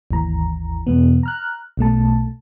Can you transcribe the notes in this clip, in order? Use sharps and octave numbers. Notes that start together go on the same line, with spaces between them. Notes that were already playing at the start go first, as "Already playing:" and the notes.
G#1 D#2 E3 A#5
E2 B2 B3
A#5 F6 F#6
B1 B2 A3 A5